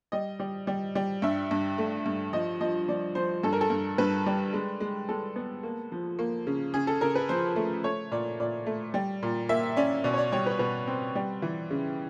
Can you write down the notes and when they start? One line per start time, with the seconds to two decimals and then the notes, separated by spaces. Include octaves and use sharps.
0.12 G3 D#5
0.40 G3
0.67 G3
0.95 G3
1.22 G2 E5
1.51 G2
1.78 A3
2.06 G2
2.33 F3 D#5
2.61 F3 D#5
2.88 F3 D5
3.15 F3 C5
3.43 G2 A4
3.53 A#4
3.61 A4
3.70 G2
3.98 G2 B4
4.26 G3
4.53 G#3
4.80 G#3
5.09 G#3 A4
5.36 B3
5.63 A#3
5.92 F3
6.19 A#3
6.47 C#3
6.74 C#3 G#4
6.87 A4
7.01 C#3 A#4
7.15 B4
7.29 F3 C5
7.56 A3
7.84 A3 C#5
8.11 A#2 D5
8.40 A#2 D5
8.66 A3
8.94 G3
9.23 A#2
9.49 A#3 E5
9.77 C#4 D5
10.04 B2 D5
10.13 C#5
10.18 D5
10.32 G3 C#5
10.46 B4
10.59 B2 B4
10.87 C4
11.15 G3
11.42 E3
11.71 C#3